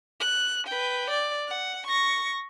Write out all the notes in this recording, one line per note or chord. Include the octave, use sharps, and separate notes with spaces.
F#6
B4 G5
D5
F#5
C#6 A#6